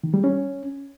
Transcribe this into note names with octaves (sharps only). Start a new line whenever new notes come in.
D#3
G3
C#4